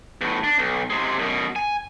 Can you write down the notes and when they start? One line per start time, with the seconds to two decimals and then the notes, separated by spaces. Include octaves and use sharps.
0.21 E2 A2
0.44 D4
0.59 B1
0.90 C3 G#3
1.19 F#2 B2
1.56 G#5